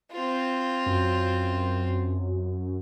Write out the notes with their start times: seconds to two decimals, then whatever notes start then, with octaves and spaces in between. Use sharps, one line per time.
0.11 C4 F4
0.86 F#2